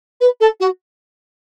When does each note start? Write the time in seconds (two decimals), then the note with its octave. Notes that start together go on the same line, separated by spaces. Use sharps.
0.20 B4
0.40 A4
0.59 F#4